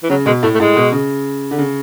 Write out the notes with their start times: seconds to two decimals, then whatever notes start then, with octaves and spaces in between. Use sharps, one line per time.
0.03 E3
0.10 C#3 F#3
0.26 B2 G#3
0.43 A2 A3
0.55 A3
0.60 A2 G#3
0.76 B2
0.92 C#3
1.51 D3
1.58 C#3